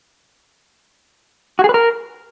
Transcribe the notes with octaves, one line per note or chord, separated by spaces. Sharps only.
F#4
G#4
B4
A#4